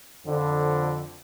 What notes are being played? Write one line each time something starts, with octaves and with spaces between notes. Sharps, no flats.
F2 D3